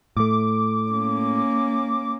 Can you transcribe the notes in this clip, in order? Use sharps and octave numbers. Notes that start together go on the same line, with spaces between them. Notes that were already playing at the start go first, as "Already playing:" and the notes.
A2 A3 D6
A#3 C#4